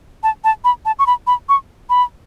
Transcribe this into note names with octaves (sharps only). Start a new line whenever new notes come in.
A5
A5
B5
A5
C#6
B5
B5
C#6
B5